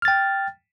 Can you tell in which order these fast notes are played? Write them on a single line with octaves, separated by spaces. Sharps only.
F6 A6 G5